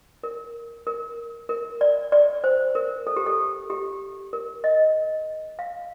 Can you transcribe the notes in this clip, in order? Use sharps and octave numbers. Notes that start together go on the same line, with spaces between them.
A#4
A#4
A#4
D5
D5
C5
A#4
A4
G4
A4
G4
A#4
D#5
F5